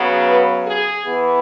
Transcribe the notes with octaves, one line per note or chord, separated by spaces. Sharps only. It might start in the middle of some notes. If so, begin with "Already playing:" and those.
Already playing: C#3 F#3 B3
B4
G#4
E3 B3